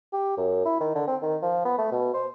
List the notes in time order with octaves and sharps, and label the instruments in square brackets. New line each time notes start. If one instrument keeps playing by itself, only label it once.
[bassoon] G4
F#2
E4
D#3
D3
C4
D#3
F3
B3
A3
B2
C5